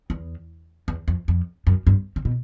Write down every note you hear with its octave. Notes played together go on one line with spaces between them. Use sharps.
E2
E2
F2
F2
F#2
G2
C#3
B2